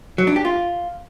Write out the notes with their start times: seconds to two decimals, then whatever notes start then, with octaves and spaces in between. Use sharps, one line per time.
0.18 F#3
0.27 D4
0.36 G4
0.45 F4